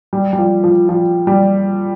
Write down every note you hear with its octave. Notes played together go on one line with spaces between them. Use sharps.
G3
G3
F3
F3
F3
G3